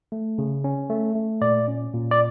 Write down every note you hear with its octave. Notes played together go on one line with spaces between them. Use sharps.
A3
C#3
C#4
A3
A3
A#2 D5
C#4
A#2
D5